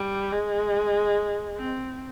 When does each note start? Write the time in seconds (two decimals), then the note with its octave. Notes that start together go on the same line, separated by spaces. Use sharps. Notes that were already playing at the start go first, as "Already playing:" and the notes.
Already playing: G3
0.32 G#3
1.57 C4